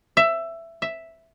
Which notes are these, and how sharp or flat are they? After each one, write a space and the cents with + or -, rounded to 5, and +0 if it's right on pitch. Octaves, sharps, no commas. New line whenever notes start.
E5 +15
E5 +0